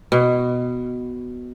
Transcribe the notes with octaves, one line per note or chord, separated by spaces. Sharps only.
B2